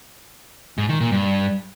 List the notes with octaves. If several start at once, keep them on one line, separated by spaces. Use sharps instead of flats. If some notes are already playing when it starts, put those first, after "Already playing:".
G#2
D#3
A#2
G2